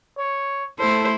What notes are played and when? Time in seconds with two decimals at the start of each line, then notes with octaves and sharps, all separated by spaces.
0.18 C#5
0.79 A3 E4 A4 C5